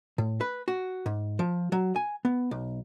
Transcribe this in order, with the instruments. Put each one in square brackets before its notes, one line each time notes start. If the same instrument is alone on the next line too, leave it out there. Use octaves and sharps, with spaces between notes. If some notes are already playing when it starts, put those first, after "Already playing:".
[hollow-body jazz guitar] A2
B4
F#4
G#2
F3
F#3
G#5
B3
B1